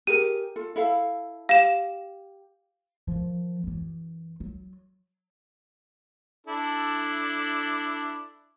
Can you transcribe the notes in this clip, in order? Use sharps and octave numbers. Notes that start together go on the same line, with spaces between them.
G4 G#4 A#4 D#7
F4 A4
E4 A4 F5
G4 F5 E7
D#3 F3
F#2 E3
F#3
D4 E4 A4